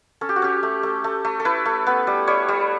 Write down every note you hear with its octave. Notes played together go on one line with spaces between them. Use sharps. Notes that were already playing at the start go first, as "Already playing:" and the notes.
C#4 A4
G4
F#4
C#4 G4
A3
A3
A3
A3
A4
E4 B4
A3
B3
G3
G3 C#5
G3